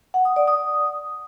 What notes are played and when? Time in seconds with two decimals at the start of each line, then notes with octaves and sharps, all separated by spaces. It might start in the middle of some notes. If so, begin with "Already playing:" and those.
0.14 F#5
0.25 D#6
0.36 D5
0.48 D#6